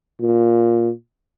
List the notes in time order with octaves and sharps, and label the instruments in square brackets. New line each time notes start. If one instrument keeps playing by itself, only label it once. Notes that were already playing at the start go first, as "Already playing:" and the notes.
[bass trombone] A#2